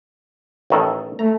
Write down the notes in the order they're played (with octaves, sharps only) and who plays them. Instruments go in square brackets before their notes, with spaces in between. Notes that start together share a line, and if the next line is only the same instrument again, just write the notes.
[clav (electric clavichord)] A1 D#3 A4
[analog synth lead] A3 [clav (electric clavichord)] A#5